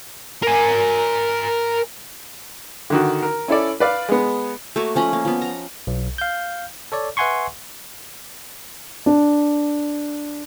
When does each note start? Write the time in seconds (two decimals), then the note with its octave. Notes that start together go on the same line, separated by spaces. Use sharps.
0.43 A#4 G#5
2.90 D3 D#3 F#4
3.23 A#4
3.48 C#4 E4 A4 D5
3.80 B4 D5 F5
4.09 G#3 B3
4.76 A3 A#3 F#4 C#5
4.95 F3 C#4 D#5 B5
5.13 A#3
5.25 F3 B3
5.42 A#5
5.87 B1
6.18 F5 G6
6.92 A4 C#5 D5
7.17 B4 E5 F#5 G#5 C6 C#6
9.06 D4